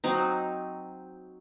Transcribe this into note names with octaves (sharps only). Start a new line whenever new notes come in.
F#3 C4 D#4